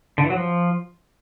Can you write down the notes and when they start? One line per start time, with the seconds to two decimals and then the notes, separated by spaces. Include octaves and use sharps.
0.18 D3
0.24 E3
0.30 F#3
0.36 F3